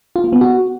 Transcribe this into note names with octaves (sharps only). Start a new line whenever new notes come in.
F4
A#3
B3
F#4